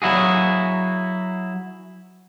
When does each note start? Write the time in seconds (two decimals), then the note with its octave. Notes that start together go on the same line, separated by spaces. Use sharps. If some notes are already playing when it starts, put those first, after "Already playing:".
0.02 F#3 E4 F#4 G#4